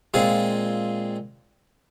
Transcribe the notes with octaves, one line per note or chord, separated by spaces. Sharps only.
A#2 G#3 C4 F4 G#4